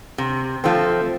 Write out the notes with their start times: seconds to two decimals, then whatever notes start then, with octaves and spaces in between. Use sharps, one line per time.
0.18 C3
0.64 F3 A3 C4